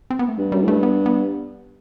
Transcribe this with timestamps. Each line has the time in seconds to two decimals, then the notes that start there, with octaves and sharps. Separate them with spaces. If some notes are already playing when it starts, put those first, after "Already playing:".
0.10 C4
0.19 B3
0.28 A3
0.37 G2 G3
0.52 F#2 G3
0.62 A2
0.68 G2 A3
0.83 B3
1.06 B3